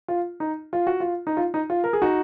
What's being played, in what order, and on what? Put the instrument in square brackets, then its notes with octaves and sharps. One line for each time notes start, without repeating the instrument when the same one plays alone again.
[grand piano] F4
D#4
F4
F#4
F4
D#4
F4
D#4
F4
A#4
G#4
D#4 F#4